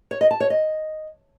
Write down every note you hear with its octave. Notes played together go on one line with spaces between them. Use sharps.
C#5
D#5
A5
C#5
D#5